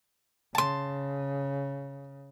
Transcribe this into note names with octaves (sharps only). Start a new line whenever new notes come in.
C#3 A5 C6